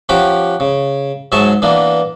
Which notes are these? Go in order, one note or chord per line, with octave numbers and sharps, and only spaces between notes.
F3 C#4 G4 F#5 B5 D6
C#3
G#2 F#3 G#4 E5 A5 C#6
E3 A#3 B3 D4